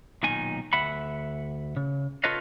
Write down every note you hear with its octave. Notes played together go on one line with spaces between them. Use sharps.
B1 A#2 D#3 D#4 G#5
D2 E5 F#5 B5
C#3
F4 A4 B4 C#5 D#5 F5